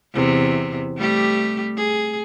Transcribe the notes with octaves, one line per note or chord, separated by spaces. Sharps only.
E2 C3
G3 A3 G4
G#4